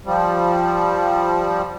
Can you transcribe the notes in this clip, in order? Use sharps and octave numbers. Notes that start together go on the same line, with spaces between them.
F3 G3